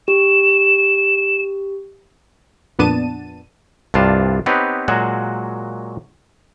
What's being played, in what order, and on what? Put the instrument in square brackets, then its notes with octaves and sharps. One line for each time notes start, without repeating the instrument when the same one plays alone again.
[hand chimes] G4 [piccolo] E7
[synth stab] F2 A#2 B3 D4 A5 D#7
[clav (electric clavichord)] C2 G2 D4 F4 A5
B3 C4 D#4 G4 B4 C#5
A#2 F#3 G#3 F#4